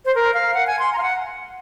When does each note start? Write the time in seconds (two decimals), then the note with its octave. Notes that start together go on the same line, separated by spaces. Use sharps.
0.05 C5
0.15 A#4
0.34 F5
0.54 F#5
0.67 G#5
0.79 C6
0.93 A#5
0.98 F5
1.02 F#5